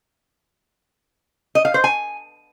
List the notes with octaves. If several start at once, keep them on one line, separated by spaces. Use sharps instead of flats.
D#5
F5
C5
G#5